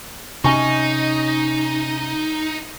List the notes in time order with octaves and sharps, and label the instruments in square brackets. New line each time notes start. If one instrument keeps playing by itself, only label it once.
[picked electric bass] C3 C#4 [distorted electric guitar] D#4 [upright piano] G#5 C#6